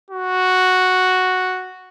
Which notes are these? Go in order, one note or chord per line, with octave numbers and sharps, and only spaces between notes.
F#4